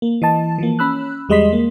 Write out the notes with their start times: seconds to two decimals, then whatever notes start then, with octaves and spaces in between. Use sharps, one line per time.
0.02 A#3
0.22 E3 D#5 A5
0.58 E3 F3 A#3
0.79 C#4 B5 E6 F#6
1.29 E2 G3 G#3 D#5 C6 B6
1.53 A#3